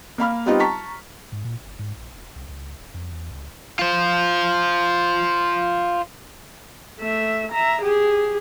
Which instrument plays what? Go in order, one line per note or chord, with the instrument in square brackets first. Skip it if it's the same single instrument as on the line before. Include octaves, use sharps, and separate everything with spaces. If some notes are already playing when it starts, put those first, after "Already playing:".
[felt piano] A#3 F5 B5 F6
G3 B3 C4 D#4 F4 G4
A5 A#5 C#6 B6
[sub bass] G#2
A#2
G1
G#2
A#1
E1
C2
C#2
D#1
F2
E2
C#2
[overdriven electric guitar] F4 C5
[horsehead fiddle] A3 E5
E5 A#5
G4 G#4